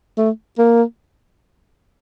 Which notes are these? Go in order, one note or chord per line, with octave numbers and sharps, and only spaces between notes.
A3
A#3